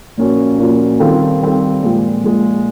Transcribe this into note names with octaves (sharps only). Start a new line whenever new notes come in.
A#2 F3 A#3 C#4 F#4
A#2 F3 A#3 C#4 F#4
D#3 G3 C4 F4 A4
D#3 G3 C4 F4 A4
A#2 F3 G#3
A#2 F3 G#3